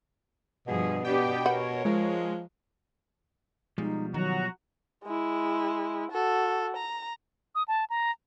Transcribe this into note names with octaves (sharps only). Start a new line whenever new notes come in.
G2 B2 F3 G#4
B3 D4 G4 G5
A#4 B4 C#5 F#5 B5
F3 G#3
B2 F3 G3 G#3 D#4
D#3 F#3 F#4 A#5
G#3 E4
F#4 A4
A#5
D#6
A5
A#5